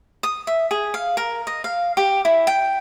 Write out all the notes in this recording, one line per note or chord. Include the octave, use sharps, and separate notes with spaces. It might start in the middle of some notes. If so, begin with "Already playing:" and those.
D#6
E5
G#4
F5
A#4
D#5
F5
G4
E4
G5